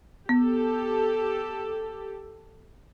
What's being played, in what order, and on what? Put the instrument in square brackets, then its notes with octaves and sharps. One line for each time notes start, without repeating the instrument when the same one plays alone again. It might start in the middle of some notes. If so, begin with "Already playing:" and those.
[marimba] B3 [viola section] G4 A4